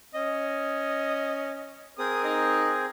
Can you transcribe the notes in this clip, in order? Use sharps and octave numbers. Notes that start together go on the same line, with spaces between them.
C#4 D#5
C4 G#4 A#4 D#6
D#4 D#5